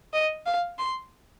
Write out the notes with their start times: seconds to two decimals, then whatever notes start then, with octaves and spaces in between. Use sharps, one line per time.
0.13 D#5
0.46 F5
0.79 C6